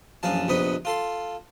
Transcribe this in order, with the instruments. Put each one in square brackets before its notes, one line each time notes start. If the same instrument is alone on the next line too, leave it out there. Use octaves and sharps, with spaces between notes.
[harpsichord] A#1 F#2 E3 F5 A5
A#1 F2 C3 B3 B4 D#5
F4 A4 C6